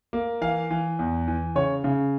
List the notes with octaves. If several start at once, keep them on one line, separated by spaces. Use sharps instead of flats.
A#3
E3 F5
E3
E2
E3
C#3 C#5
C#3